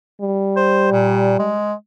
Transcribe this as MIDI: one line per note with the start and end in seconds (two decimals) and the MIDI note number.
0.21 1.57 55
0.57 0.92 72
0.92 1.35 46
1.39 1.74 56